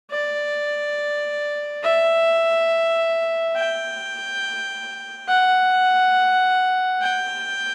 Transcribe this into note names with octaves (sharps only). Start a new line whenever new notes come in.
D5
E5
G5
F#5
G5